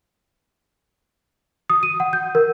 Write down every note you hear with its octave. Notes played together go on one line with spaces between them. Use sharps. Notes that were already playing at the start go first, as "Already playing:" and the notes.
D#6
D#7
F#5
G6
A#4